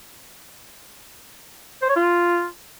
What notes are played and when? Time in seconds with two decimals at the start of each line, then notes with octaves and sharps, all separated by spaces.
1.82 C5
1.89 C#5
1.96 F4